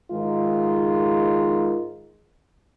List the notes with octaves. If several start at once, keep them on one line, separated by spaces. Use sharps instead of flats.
G#2 D#3 G#3 F4